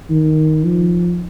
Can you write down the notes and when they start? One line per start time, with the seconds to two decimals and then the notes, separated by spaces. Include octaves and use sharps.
0.10 D#3
0.66 F3